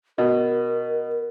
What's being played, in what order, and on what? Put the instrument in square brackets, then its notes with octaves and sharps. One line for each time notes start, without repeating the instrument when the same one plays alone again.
[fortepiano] B2 [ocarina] A#4